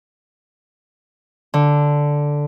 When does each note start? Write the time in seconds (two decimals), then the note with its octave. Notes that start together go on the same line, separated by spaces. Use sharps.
1.54 D3